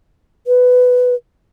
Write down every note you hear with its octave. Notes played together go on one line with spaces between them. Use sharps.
B4